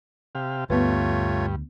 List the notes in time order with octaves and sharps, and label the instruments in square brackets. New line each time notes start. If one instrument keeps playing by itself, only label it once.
[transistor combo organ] C3 G4 F5
[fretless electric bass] D2 [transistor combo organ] G2 [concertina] A3 F4 C#5 [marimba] B3 B4